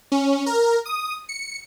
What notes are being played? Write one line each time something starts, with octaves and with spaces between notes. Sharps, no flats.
C#4
A#4
D#6
C#7